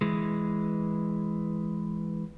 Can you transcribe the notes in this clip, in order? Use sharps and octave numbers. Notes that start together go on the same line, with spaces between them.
E3 G#3